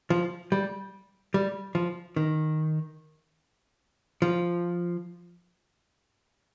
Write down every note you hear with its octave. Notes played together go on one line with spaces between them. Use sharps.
F3
G3
G3
F3
D#3
F3